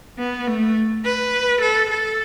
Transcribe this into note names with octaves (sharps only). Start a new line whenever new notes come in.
B3
A3
B4
A4
A4